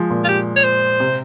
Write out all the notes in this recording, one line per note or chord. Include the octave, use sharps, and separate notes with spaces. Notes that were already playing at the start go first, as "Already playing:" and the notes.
Already playing: F3 G#3
A#2
F4
G4
C#5
C5
C3